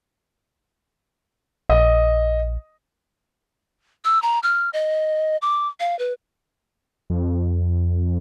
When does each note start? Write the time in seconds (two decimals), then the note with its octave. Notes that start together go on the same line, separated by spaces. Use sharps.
1.69 A#1 D#5
4.05 E6
4.22 A#5
4.43 F6
4.73 D#5
5.42 D6
5.80 F5
5.99 B4
7.10 F2